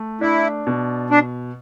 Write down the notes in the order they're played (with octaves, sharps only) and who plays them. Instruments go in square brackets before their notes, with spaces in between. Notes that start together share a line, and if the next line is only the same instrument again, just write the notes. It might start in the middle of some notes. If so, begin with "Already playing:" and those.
Already playing: [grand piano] A3
[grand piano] D4 [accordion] E4
[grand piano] B2
[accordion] D4